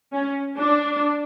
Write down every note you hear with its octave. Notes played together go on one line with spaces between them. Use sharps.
C#4
D4